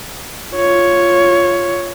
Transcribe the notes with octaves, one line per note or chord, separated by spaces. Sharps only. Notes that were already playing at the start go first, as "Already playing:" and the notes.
F4 C#5